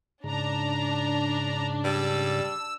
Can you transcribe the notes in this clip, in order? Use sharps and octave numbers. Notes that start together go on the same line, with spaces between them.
G#2 C#3 D4 A#5
G3 E6